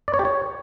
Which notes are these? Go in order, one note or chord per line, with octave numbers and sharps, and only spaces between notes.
D5
C#5
G4
C#5